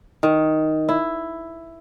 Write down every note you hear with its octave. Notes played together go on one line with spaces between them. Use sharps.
D#3
E4